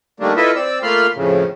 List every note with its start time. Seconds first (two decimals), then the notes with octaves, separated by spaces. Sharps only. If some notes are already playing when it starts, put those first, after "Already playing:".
0.20 D#3 G3 A3 A#3 D4
0.37 E4 F4 A4 B4 D#5 E5
0.55 C4 D5 E6
0.83 A3 A#3 F4 B5 C6 F6
1.15 F2 A2 C#3